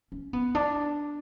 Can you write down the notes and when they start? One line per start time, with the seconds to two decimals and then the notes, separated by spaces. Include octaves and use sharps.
0.12 C#4
0.33 B3
0.55 D4